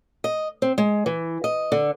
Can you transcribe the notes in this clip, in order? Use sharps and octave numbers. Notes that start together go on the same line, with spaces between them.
D#5
C4
G#3
E3
D#5
D3